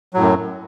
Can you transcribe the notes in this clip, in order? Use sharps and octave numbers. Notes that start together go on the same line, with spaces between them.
F#2 A2 F#3